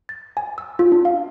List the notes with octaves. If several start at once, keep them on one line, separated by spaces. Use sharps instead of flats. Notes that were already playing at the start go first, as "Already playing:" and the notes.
A6
G#5
E6
F4
D4
F5